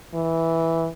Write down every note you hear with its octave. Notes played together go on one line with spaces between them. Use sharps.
E3